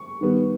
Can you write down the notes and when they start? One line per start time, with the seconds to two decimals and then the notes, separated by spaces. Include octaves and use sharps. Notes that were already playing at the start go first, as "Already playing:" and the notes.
Already playing: C#6
0.21 D#3 G3 B3